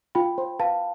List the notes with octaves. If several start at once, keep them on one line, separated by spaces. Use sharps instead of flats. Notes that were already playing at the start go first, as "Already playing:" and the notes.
F4 G5 B5
C5
B4 F5 A5